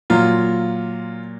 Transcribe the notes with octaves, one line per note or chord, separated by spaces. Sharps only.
A#2 F#3 F4